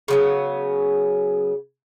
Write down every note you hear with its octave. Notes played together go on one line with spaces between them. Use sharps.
C#3 F#3 B3